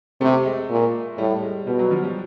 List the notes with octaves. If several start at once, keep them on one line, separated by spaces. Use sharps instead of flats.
C3 A3
G#3
A#2
A2 G3
G#3
B2 G3
F#3
F3
G3